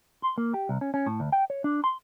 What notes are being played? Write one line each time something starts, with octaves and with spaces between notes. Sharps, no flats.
C6
A#3
G4
C2
C#4
C#4
A2
D2
G5
C#5
D4
C6